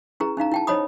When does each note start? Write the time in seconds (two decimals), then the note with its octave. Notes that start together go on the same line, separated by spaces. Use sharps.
0.20 C#4 E4 G#4 B4 A#5
0.37 C#4 D#4 F5 A#5
0.52 E4 G5 A5
0.67 D#4 C5 C#5 D#5 B5 D#6